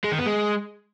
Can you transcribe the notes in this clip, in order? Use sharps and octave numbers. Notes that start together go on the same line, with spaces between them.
G#3
D#3
B3
G#3